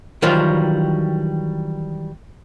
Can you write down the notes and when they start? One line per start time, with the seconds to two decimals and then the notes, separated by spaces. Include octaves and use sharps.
0.22 D#3 E3 F#3 G3 F4 C5